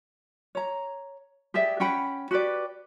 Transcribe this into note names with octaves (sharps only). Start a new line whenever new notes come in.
C#5 A#5
G4 G#4 D5 E5
C#4 F#5 G5 B5
F#4 G4 B4 D5